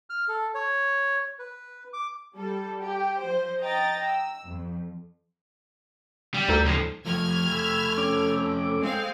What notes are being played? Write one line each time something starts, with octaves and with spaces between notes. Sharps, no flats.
F6
A4
C#5
B4
D6
G3 A4
G4
F3 C5
D#5 G5 A#5 A6
E6
F2
G3
D2 D#4 A4
C#2 F3
F2 F3 A3 F6 G#6
A4 B5 E6
C#4 D6
G#3 C4 F5